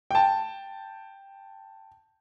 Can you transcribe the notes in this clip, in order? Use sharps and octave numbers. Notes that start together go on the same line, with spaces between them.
G5 A5